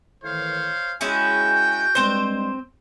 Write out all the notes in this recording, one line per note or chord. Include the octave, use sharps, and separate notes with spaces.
A2 D#3 E3 C5 C#5 F5
G#3 C#4 E4 F#4 G5 G#5
G2 G3 G#3 C4 C5